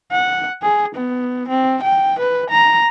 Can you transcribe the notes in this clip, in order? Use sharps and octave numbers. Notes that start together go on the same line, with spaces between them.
F#5
G#4
B3
C4
G5
B4
A#5